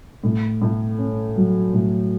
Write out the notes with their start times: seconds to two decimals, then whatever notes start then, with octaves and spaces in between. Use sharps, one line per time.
0.23 A2
0.61 A2
0.98 C#4
1.36 F#3
1.73 A2